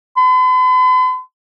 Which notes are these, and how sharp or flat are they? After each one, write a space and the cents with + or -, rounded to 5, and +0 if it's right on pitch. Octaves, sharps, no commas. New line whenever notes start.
B5 +45